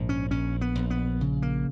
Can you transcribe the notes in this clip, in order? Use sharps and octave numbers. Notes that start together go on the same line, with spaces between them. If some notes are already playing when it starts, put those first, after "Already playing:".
Already playing: A#1 G#2
C#4
A#1 C#4
B3
A#1
B3
C#3
A#3